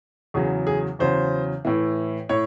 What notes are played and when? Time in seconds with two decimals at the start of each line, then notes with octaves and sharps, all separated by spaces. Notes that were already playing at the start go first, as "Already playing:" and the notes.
0.34 E2 C#3 F#3 G#4
0.67 G#4
0.99 E2 C#3 F#3 C5
1.65 A2 E3
2.29 A2 C#5